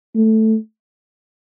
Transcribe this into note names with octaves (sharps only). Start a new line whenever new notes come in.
A3